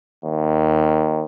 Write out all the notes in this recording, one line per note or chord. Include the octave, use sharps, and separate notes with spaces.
D#2